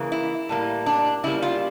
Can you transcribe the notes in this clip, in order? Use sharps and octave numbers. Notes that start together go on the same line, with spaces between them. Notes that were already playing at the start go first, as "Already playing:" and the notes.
Already playing: C#3 E3 A#3
E4
A2 G3 A#3
D4
C#3 G3 A#3 E4
F4